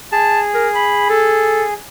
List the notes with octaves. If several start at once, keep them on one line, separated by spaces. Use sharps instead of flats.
G#4 A5
A#4
B5
A4